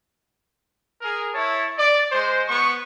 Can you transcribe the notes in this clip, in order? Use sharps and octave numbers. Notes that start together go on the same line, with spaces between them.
G#4 A#4
E4 C#5 A5
D5
G#3 C5
B3 C#6